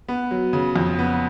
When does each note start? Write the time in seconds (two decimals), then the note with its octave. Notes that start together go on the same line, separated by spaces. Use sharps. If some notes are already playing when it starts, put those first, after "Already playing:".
0.08 B3
0.31 F#3
0.53 C#3
0.76 F2
0.99 B3